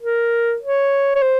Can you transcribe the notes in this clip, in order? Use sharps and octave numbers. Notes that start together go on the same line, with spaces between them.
A#4
C#5
C#5
C5